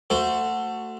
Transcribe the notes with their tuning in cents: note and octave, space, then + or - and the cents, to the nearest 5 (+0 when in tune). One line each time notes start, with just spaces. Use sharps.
A3 +20 F#4 +0 C5 -10